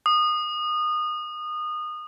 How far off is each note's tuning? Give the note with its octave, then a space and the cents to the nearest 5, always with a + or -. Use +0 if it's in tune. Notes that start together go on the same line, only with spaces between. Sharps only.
D#6 -25